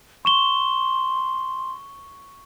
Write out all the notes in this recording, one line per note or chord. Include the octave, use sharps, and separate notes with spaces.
C6 C#6 E7 G7